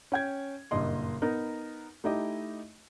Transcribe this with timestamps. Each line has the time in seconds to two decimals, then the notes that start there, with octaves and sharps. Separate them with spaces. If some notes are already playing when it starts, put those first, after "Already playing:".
0.12 C#4 G5 G#6
0.71 F#1 G2 A#2 D#5 C6
1.22 B3 D#4 A#4
2.04 A3 D#4 E4 G4 D#5